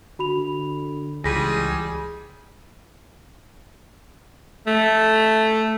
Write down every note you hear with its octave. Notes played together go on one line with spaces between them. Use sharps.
D3 F#4 B5 F7
C#2 E3 G3 G#3 G#4 A#6 B6 D#7
A3